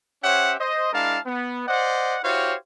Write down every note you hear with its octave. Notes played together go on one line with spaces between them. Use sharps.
C#4 G4 C5 C#5 E5 F#5
C5 D#5
G#3 D4 E4 A#4 F5 A5
B3
C5 D5 D#5 F#5
E4 F#4 G4 C5 C#5 F5